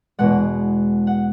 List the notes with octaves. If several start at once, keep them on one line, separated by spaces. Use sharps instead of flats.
E2 B2 G#3 F#5
F#5